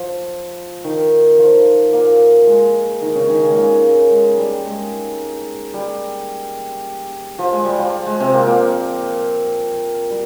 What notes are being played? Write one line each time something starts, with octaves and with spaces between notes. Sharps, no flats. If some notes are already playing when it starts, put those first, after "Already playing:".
Already playing: F3
D#3
F3
A#2 A#3
G#3
D#3 D#4
C#3 C#4
D#3 D#4
C#3 C#4
G#3
A#2 A#3
G#3
G3
G#3
G3
F3
G#3
G3
F3
G#3
C3 C4
A#2 A#3
A#2 A#3
G3